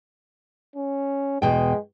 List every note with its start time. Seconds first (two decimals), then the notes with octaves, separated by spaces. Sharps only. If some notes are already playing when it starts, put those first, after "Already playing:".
0.76 C#4
1.42 E2 B2 G#3 G5